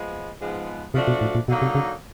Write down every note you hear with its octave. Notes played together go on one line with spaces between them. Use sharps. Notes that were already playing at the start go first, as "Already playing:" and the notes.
Already playing: F3 G#3 B3
G#2 F3 G#3 B3
C3 F3 A3 D4 F#4
B2
A2
A#2
B2 D3 F#3 A#3 D#4
C3
C#3